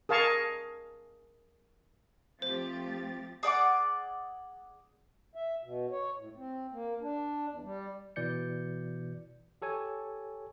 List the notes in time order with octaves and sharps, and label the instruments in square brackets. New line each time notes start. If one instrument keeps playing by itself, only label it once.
[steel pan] G#4 A#4 F5 A5 C#6
[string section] F3 A6 [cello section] A3 G4 [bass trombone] C4 [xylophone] C5
[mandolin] G#4 D5 F#5 D6
[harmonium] E5
B2
C#5
A2
C4
A#3
D4
E2
G3
[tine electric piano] B2 E3 D5 G6 C#7
G4 A4 C#5 G#5